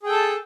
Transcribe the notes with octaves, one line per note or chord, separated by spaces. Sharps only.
G#4 A4 G5 A5